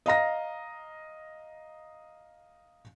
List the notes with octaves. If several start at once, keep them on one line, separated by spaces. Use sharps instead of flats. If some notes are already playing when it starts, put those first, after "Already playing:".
D#5 F5 A#5 A#6